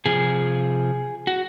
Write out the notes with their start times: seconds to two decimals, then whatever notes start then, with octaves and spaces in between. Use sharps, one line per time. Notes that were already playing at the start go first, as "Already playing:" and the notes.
0.06 C3 F3 G#4
1.27 F#4